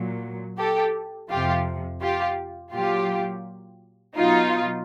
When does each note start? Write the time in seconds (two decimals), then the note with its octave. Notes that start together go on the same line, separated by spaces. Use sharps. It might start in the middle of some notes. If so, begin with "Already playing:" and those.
Already playing: A#2 F#3
0.58 G4 A4
1.30 F2 C3 F3 F4 G4
2.01 F4 G4
2.72 A#2 F#3 F4 G4
4.16 B2 F#3 D#4 F4